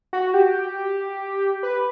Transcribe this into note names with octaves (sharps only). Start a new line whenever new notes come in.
F#4
G4
B4